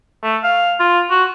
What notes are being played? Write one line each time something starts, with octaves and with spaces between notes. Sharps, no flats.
A3
F5
F4
F#4